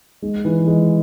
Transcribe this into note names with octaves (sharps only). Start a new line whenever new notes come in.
G#3
E3
G#3